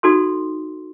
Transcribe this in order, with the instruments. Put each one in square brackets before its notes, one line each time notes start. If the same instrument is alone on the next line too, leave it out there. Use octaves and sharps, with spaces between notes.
[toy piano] D#4 F#4 A4 C6